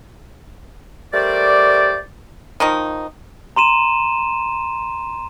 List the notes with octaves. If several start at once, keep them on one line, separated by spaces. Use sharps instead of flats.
G3 A3 A#4 C5 D5
D#3 F3 D#4
A#5 C6 D#7 E7